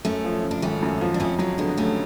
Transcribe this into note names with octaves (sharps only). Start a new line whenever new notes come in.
F#2 A3 C#4
F3
C#3
D4
G#1 A3 C#4
F#2
F3
D4
F2 A3 C#4
F#3 A3 C#4
D3 G#3 B3
F1 A3 C#4